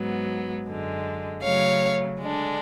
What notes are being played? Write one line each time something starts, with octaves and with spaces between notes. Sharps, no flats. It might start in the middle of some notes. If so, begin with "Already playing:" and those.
Already playing: G#2 F#3 B3
F#2 D3 G#3
C#3 F#3 A3 C#5 F5
D3 G#3 D4